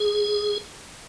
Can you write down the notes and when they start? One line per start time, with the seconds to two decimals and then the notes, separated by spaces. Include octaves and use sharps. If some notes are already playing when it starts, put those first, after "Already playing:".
Already playing: G#4